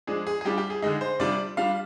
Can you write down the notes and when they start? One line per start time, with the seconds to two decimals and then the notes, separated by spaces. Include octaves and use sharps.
0.07 F3 G#3 D4 G#4
0.27 G#4
0.41 G#4
0.45 G3 D4 F4 G4
0.58 G4
0.70 G#4
0.82 D3 G#3 D#4 G#4
1.01 C5
1.19 C3 G3 D4 F4 D5
1.57 G3 D4 F4 F5